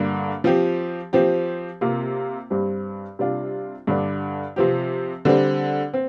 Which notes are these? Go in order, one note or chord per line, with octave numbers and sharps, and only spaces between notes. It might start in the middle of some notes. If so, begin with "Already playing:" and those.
Already playing: G2 D3 A#3 D4
F3 C4 G4
F3 C4 G4
C3 A#3 F4
G2 G3 C4
C3 G3 D4 F4
G2 D3 G3 D4
C3 F3 C4 G4
D3 G3 C4
C4